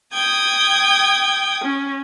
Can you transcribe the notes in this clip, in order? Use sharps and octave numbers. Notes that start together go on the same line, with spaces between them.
G5 D#6 G#6
C#4